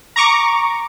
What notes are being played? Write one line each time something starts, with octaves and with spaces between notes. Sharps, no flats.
A#5 C#6 D6